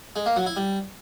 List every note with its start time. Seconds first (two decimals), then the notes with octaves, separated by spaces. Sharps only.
0.16 G#3
0.26 A#3
0.36 F#3
0.46 E4
0.56 G3